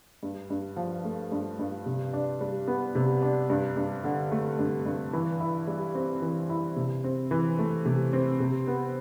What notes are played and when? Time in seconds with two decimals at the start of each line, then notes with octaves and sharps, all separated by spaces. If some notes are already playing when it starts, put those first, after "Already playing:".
0.23 G2
0.50 G2
0.77 F3
1.04 A3
1.32 G2
1.59 G2
1.86 C3
2.13 D4
2.41 G3
2.68 B3
2.95 C3
3.22 D4
3.50 G2
3.77 G2
4.04 D3
4.32 A3
4.59 G2
4.86 G2
5.13 E3
5.40 E4
5.68 G3
5.95 C4
6.22 E3
6.49 E4
6.76 C3
7.04 C4
7.31 E3
7.59 A3
7.85 C3
8.13 C4
8.40 C3
8.67 B3